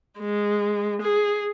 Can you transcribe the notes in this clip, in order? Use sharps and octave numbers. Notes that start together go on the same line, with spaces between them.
G#3
G#4